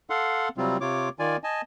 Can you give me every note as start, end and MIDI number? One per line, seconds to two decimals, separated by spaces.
0.10 0.49 69
0.10 0.49 77
0.10 0.49 78
0.10 0.49 84
0.57 0.77 48
0.57 0.77 54
0.57 0.77 55
0.57 0.77 60
0.57 0.77 65
0.81 1.09 48
0.81 1.09 65
0.81 1.09 73
0.81 1.09 86
1.19 1.37 51
1.19 1.37 65
1.19 1.37 74
1.19 1.37 80
1.44 1.61 75
1.44 1.61 80
1.44 1.61 81